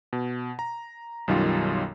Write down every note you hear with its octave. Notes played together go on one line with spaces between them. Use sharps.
B2
A#5
B1 F#2 D#3 G3 F4